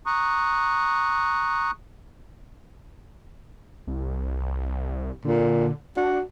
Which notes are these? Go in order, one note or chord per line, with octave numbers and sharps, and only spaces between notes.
A#5 C#6 D#6 F#6
C2
A#2 D3
D4 F#4